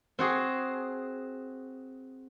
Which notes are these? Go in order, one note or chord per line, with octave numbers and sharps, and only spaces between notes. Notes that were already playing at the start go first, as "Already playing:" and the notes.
C4 F#4 G#4